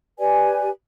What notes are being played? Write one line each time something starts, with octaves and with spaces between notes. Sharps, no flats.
G4 B4 D5 G#5